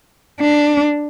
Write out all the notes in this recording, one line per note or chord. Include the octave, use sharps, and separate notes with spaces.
D4